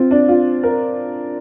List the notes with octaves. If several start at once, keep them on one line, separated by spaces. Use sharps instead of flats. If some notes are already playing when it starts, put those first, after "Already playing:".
Already playing: C4 F4
D4
F4
A#4